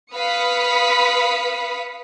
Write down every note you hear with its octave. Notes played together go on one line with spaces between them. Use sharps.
B4 F5 B5 D#6 B6 C#7